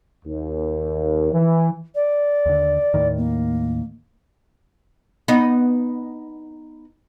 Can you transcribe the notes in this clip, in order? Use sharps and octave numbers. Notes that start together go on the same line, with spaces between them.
D#2
E3
D5
D#2 D3
D#2 A2 D#3
A#3
B3 D#4